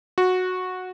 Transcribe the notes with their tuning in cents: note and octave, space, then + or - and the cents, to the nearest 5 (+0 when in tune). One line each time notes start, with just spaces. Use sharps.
F#4 -10